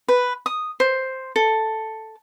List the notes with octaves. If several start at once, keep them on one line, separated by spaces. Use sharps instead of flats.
B4
D#6
C5
A4